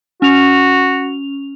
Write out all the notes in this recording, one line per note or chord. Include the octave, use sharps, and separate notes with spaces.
C#4 F#4 F7